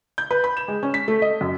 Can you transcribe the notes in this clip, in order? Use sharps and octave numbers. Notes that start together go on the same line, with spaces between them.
G6
B4
B5
E7
G#3
C#4
B6
A3
D#5
F#2